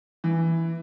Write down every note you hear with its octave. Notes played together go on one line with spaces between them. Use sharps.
E3